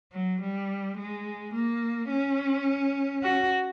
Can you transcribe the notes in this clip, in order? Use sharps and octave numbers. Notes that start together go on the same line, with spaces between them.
F#3
G3
G#3
A#3
C#4
F#4